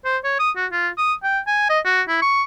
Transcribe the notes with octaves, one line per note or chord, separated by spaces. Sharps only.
C5
C#5
D#6
F#4
F4
D#6
G5
G#5
D#5
F#4
E4
C#6